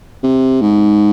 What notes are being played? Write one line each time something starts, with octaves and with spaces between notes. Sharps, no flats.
C3
G#2